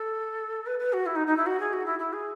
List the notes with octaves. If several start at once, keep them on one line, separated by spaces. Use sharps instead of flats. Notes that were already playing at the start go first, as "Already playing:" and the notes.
Already playing: A4
B4
B4
F#4
E4
D#4
D#4
E4
F#4
G#4
F#4
E4
E4
G#4